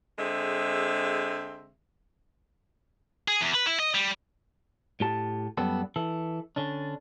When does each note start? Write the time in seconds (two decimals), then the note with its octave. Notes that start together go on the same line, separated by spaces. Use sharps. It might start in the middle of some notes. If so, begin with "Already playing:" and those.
0.19 D3 G#3 C4 G#4 E5
3.28 G#4
3.41 E2
3.54 B4
3.67 E4
3.80 D#5
3.95 G3
5.00 A2 G4 A5
5.57 F#2 G3 B3 A4
5.96 E3 A4
6.56 D3 C#4 D4